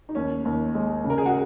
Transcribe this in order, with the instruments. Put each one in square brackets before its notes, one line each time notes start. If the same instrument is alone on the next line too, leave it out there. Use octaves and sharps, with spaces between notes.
[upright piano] D#4
[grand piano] D#2 [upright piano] C#4
[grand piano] D#2
G#3
C#3
[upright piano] A#4
G#4
F#4